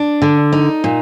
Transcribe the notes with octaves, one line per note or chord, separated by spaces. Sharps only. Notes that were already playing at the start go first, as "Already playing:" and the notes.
Already playing: D4
D3
D#4
A#2